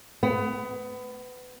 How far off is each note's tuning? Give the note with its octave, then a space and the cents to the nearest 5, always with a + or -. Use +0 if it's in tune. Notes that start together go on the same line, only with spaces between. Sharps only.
B3 +25